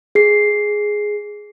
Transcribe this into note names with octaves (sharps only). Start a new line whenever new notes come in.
G#4 C7